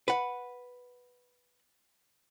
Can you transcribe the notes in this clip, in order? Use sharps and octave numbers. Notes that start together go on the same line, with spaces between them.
B4 F#5